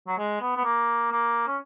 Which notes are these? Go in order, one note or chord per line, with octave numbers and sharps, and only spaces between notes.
F#3
G#3
B3
B3
A#3
A#3
C#4